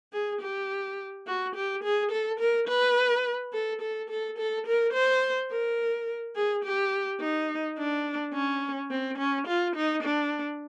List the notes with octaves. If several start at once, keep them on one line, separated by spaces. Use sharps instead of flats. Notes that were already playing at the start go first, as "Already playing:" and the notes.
G#4
G4
F#4
G4
G#4
A4
A#4
B4
A4
A4
A4
A4
A#4
C5
A#4
G#4
G4
D#4
D4
C#4
C4
C#4
F4
D#4
D4